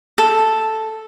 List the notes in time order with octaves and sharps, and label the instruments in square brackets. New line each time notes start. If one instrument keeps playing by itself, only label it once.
[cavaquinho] A4